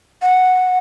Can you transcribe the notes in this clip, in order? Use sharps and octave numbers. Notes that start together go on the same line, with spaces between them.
F#5